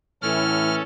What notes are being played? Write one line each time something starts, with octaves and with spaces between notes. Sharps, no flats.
A2 E3 C#4 E4 A4 F6